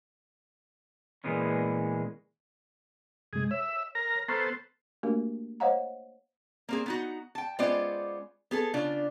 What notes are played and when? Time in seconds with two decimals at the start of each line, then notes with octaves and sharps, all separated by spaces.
1.24 A#2 E3 G#3 B3 C#4
3.33 F#2 C3 G#3 G#4
3.51 C#5 E5
3.95 A#4 A#5
4.28 B3 A4 C5 A#5 C#6 F6
5.03 A3 A#3 D4 F#4 G4 A#4
5.60 C5 C#5 D#5 F5 F#5 A#5
6.69 A#3 C4 G#4
6.86 B3 D#4 F#4
7.35 G5 A5
7.59 G#3 B3 C#4 F4 C5 D5
8.51 B3 G#4 A4
8.74 C#3 D4 F4